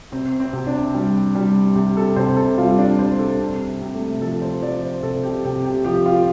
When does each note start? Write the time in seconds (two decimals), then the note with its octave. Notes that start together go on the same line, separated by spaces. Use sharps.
0.12 C3 C4
0.40 C4
0.53 C3
0.67 D4
0.94 G3
1.35 G3
1.75 C3 G4
1.97 A4
2.16 C3 C5
2.36 A4
2.57 G3 F4
2.78 D4
2.99 G3 C5
3.19 A4
3.39 C3
3.81 C3
3.95 A3
4.21 F3 A4
4.42 C5
4.62 F3 D5
4.83 C5
5.03 C3 A4
5.23 G4
5.45 C3 G4
5.65 G4
5.84 F3 G4
6.06 F4